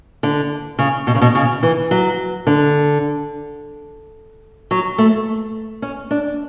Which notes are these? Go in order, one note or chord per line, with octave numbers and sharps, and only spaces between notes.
D3
C#3
B2
C#3
B2
C#3
E3
F#3
D3
F#3
A3
C#4
D4